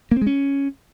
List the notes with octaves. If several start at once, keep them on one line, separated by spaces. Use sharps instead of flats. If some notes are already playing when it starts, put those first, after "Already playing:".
A#3
C4
G#3
C#4